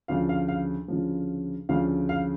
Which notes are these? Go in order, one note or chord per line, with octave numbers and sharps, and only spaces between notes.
D2 C#3 F3 F5
F5
F5
D2 C#3 F3
D2 C#3 F3 F5
F5